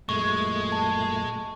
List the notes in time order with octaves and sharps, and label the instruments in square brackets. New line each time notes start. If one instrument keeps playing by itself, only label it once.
[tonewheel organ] F#2 A#2 A3 [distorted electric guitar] G#3 [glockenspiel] C#6
[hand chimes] A5